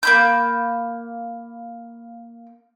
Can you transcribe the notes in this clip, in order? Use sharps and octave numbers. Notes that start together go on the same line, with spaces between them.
A#3 B5 G6